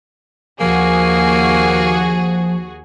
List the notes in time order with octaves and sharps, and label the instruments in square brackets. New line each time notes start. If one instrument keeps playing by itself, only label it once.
[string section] D#2 F#4 G#4 [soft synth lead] F3 [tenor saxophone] A#3